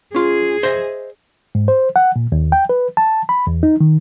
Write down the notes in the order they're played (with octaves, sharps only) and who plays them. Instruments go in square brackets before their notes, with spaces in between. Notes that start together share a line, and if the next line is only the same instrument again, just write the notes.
[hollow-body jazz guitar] C#4 F4 [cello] G#4
[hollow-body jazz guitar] C5 D#5 E5
[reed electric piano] G#2
C5
F#5
A#2
D#2
G5
B4
A5
B5
E2
D#4
D#3